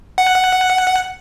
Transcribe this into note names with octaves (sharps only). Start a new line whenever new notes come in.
F#5